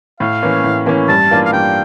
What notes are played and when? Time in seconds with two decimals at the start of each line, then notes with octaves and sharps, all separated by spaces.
0.20 A2 F5
0.43 E3 A#3 C#4
0.64 A2
0.86 E3 A#3 C#4
1.09 G2 A5
1.31 E3 A#3 D4 F4
1.45 F5
1.52 G2 G5